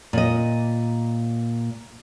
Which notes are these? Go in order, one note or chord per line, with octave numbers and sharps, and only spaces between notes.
A#2 D#5